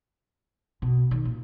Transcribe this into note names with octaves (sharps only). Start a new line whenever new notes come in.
B2
D#3
A#2